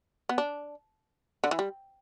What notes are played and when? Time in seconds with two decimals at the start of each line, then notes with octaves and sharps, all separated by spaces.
0.29 B3
0.38 D4
1.44 D3
1.51 E3
1.59 G3